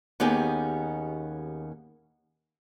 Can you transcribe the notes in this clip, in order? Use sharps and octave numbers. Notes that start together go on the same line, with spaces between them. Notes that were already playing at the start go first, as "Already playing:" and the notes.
D#2 B3 C#4 D#4 G4 G#4